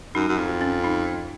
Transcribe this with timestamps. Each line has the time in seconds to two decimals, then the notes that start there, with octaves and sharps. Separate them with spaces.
0.15 F#2 D#4
0.29 F#2
0.38 F2
0.61 C#4
0.84 D#4